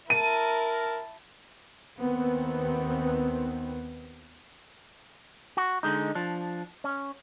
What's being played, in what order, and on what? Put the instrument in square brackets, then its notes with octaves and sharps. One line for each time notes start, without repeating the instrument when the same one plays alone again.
[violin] E4 A5 [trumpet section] A#4 [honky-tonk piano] D#7
[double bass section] D#2 D#3 B3 C4
[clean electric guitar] F#4
D3 G#3 D#4
F3 D4
C#4